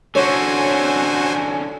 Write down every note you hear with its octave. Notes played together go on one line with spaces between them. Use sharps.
D3 C#4 F#4 C5 C#5 G#5